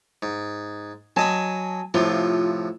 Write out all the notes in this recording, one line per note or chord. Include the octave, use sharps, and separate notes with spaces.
G#2
F#3 D#5 G#5 A5 B5
A2 C3 F3 F4